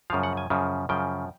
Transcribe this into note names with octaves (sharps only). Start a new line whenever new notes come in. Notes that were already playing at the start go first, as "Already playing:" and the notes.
F#2 C#3 F3 F5
F#5
G#5
F#2 C#3 F3
F#2 C#3 F3 G5